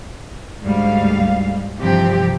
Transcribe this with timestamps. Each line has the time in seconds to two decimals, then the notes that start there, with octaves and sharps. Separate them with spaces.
0.62 D2 G#2 G3 F5
1.80 G2 C3 E3 F3 C4 G4